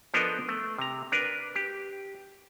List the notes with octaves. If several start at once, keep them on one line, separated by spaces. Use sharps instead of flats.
F3 B3 D4 A4 A#4 D#5
A3
C3 A#5
D4 A#4 B4
G4